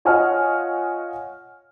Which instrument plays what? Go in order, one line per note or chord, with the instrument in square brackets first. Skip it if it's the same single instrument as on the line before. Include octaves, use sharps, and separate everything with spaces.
[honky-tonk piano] F4 C#5 D#5 F#5 G#5 F6